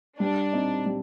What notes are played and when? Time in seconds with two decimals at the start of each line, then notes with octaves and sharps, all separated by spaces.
0.20 G3 D4
0.53 C4 D#4
0.86 G3